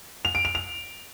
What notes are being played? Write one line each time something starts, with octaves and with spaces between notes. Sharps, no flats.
F7
D7
F7
F7